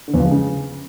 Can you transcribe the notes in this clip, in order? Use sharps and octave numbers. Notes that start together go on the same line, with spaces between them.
D3
E2
F3
G#3
C#3